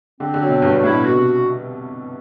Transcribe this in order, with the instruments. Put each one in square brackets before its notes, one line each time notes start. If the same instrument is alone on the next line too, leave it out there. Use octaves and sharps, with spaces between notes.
[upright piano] D3 [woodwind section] C4
[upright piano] D3
[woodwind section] F#3
[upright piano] B2
[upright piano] G2 [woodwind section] A3
[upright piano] G2
[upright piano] A2 [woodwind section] E4
[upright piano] B2
[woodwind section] F#4
[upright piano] B2
C3